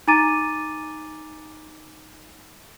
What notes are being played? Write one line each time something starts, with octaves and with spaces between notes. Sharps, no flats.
D#4 G#5 A#5 D6 A6 D#7